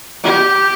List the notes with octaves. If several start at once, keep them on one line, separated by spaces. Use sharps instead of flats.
G4